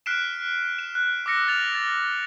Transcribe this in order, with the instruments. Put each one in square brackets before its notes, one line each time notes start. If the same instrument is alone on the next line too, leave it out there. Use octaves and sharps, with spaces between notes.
[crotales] F6 F#6 B6 C7 D7 E7
E7
F#6
D6 E6 A#6 C#7
F6 A6 F7
A6